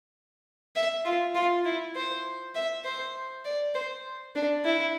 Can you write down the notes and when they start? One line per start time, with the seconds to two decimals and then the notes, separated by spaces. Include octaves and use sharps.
0.76 E5
1.05 F4
1.35 F4
1.65 E4
1.96 C5
2.55 E5
2.84 C5
3.44 D5
3.74 C5
4.35 D4
4.64 E4